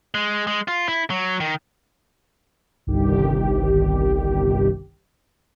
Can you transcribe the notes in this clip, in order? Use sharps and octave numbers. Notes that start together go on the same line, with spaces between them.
G#3
G#3
F4
E4
F#3
D#3
G1 C2 D#3 G4